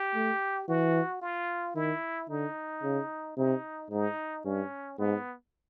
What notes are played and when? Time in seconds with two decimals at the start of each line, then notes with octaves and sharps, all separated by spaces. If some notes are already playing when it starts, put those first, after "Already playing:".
Already playing: G4
0.15 A3
0.68 E3 F#4
1.22 F4
1.76 D#3 E4
2.29 D3 D#4
2.83 C#3
3.37 C3 D#4
3.90 G#2 D#4
4.45 G2 C#4
4.98 G#2 B3